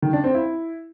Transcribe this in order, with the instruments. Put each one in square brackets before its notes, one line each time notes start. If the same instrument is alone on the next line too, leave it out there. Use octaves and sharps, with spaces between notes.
[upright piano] D#3
D4
C4
E4